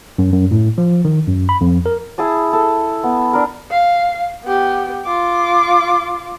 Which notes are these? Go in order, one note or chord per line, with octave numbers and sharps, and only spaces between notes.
F#2
F#2
A2
F3
D#3
F#2
B5
F2
A#4
E4 G#4 A5 D#6
A4
B3
D4 A#4
F5
B3 G4
F4 D6